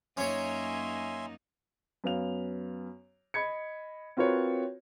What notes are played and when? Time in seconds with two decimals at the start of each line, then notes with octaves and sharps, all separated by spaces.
0.17 F#2 A#3 C#4 D#4 C#5 E5 G#5 C6
2.04 F#2 B3 F5 F7
3.34 D#5 B5 G#6 C#7
4.17 C4 F4 F#4 A#4 B4 C#5